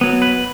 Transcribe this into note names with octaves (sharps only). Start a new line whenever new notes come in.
F#3 B3
B4